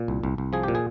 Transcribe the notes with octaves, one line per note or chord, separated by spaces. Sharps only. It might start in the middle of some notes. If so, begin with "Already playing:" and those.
Already playing: A#2
C2
C2
C2
F3 G#4
A#2 G4
G#4